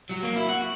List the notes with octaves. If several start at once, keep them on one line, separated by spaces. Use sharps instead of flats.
F#3
A#3
E4
F#4